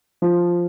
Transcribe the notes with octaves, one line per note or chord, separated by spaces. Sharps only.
F3